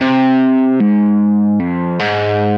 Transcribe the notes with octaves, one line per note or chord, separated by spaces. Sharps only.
C3
G#2
F2
G#2